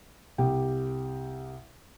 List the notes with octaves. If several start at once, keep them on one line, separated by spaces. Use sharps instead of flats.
C2 G4 G5